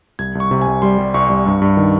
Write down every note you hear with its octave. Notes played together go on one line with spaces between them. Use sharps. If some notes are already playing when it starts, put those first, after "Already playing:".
C2 G#6
C2
C#6
C3
G#5
C2
G3 C6
G3
C2 C#6
C2
G2
G2
D#3